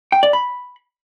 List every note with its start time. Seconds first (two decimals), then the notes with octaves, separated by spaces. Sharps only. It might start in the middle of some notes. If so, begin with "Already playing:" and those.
0.12 G5
0.23 D5
0.33 B5